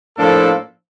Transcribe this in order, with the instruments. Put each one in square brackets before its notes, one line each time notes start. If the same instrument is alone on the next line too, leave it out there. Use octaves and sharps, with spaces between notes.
[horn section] A2 F3 A#3 D4 A4